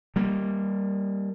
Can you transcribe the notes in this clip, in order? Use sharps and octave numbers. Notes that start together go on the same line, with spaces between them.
G3 A#3